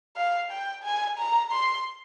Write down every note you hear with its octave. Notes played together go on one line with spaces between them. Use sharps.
F5
G5
G#5
A#5
C6